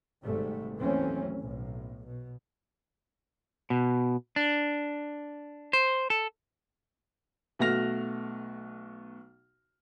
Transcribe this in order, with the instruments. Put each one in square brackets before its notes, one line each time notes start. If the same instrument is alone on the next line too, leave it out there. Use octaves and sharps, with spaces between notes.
[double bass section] G#1 G#2 C3 G3 A3
D#2 E3 F#3 A3 C4 C#4
B1 A2
B2
[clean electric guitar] B2
D4
C5
A4
[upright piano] B1 A3 F#4 F6 A#6 F7